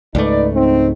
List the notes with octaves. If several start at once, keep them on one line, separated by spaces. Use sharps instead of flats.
C#2 G#2 A3 D#4 B4 D5
C4 D#4